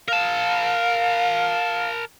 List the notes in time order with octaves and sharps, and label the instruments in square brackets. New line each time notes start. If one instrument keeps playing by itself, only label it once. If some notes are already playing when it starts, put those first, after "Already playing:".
[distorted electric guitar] A#4 A5 [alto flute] F5